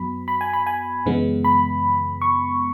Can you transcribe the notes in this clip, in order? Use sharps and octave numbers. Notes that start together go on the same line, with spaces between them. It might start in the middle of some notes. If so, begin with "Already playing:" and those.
Already playing: F#2 F#3 B3 B5
B5
G#5
B5
G#5
F#2 C#3 E3 G#3 B3
B5
C#6